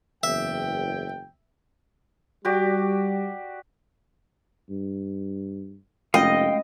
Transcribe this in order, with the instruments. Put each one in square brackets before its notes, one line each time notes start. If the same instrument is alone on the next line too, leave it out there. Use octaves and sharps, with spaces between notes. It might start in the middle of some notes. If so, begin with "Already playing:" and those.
[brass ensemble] F#1 E2 G5 [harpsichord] E5
[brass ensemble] G3 [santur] F#4 G4 D5
[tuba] G2
[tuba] F1 [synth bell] G#3 A3 C#4 [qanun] D#5 [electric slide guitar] F5 G5